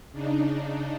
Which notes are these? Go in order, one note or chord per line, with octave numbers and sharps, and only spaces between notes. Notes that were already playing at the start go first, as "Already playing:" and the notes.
C#3 D4 D#4